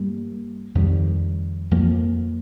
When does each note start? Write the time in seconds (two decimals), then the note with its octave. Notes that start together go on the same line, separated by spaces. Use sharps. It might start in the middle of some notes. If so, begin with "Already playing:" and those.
Already playing: G2 G3 A#3
0.75 F2 D#3 G3
1.71 F2 F3 A#3